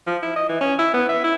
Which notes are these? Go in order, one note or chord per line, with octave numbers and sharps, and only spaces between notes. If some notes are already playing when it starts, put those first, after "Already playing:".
F3
E4
D#5
E3
C#4
E4
B3
E5
E4